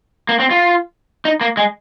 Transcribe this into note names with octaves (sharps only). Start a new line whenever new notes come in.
A#3
C4
F4
D#4
A#3
G#3